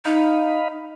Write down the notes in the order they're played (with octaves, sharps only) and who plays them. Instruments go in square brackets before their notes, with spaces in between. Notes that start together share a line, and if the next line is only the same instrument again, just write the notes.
[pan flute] D#4 [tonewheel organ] D#5 F5 B5